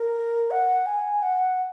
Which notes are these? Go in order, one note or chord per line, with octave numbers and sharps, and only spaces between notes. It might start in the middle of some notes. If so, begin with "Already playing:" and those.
Already playing: A#4
F#5
G#5
F#5